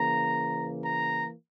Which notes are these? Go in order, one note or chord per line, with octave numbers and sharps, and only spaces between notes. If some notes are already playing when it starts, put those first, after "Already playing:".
Already playing: C#3 E3 A#3 A#5
A#5